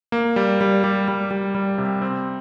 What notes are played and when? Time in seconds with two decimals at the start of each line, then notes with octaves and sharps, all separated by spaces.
0.12 A#3
0.36 G3
0.61 G3
0.84 G3
1.08 G3
1.31 G3
1.55 G3
1.78 C3
2.01 C4